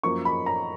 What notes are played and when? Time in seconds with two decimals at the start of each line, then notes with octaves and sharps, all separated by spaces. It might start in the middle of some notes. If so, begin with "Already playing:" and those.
0.03 F#2 F3 A#3 C#6
0.25 B5
0.46 A#5